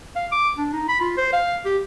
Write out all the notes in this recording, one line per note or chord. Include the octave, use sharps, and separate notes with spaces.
F5
D6
D4
D#4
B5
F4
C5
F5
G4